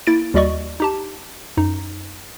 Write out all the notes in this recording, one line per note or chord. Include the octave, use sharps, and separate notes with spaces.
A#3 E4 A6 D7
D#2 G3 F#4 D5 D#5 C#6
D#4 G4 A5
F#2 D#4